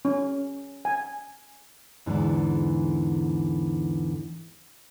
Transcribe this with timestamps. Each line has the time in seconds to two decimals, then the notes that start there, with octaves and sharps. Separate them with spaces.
0.05 C#4
0.85 G#5
2.06 E2 G#2 D3 E3